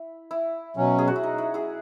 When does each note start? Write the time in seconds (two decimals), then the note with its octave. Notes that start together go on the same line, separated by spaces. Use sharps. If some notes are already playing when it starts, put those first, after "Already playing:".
Already playing: E4
0.31 E4
0.77 B2 F#3 C#4
0.99 G#4
1.07 F#4
1.16 E4
1.23 D#4
1.38 E4
1.54 E4 G#4